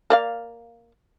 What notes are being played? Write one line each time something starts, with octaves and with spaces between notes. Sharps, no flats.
A#3 D5 F5